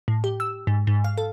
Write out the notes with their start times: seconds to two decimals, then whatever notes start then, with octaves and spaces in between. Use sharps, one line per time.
0.08 A2
0.24 G4
0.40 E6
0.67 G#2
0.87 G#2
1.04 F5
1.18 A4